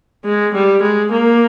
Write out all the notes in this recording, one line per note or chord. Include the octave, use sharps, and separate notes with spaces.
G#3
G3
G#3
A#3